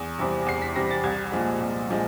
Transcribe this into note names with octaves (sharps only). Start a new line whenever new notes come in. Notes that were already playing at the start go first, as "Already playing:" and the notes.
Already playing: E2
C3 E3 G3 C4
E2 C7
B6
C3 E3 G3 C4 A#6
A6
C2 G#6
A#2 F3 G#3
C2
A#2 F3 G#3